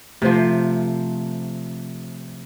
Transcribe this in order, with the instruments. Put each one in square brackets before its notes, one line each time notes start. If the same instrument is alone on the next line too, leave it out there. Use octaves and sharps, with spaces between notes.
[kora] C3 F3 [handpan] A3 C5